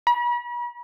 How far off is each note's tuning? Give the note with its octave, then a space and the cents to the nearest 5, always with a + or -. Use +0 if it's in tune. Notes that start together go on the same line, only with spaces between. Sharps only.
B5 -45